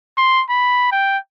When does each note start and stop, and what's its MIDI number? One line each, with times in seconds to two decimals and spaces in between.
0.18 0.43 84
0.50 0.91 83
0.92 1.18 79